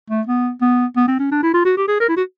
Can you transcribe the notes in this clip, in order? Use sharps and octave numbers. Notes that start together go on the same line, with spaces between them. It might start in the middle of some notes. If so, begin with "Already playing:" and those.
A3
B3
B3
B3
C4
C#4
D4
E4
F4
F#4
G4
G#4
A#4
E4
F#4